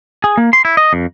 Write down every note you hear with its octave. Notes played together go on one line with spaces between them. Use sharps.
G#4
A#3
C6
E4
D#5
F2